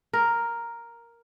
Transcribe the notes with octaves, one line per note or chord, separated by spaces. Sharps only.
A#4